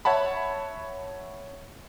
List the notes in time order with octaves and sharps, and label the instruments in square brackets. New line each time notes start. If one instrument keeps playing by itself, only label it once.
[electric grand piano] C#5 E5 F#5 A5 B5